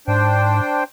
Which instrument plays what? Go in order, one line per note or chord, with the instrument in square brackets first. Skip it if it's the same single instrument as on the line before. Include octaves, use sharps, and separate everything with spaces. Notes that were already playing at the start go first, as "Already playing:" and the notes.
[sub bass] G#2 [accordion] D4 C5 G5